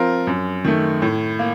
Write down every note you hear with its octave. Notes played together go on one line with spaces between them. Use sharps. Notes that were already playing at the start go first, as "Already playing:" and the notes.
Already playing: F3 C4 F4 A#4
F#2
D#3 A3
A2
A#3